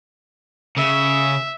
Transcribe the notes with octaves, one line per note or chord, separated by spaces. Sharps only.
C#3 E5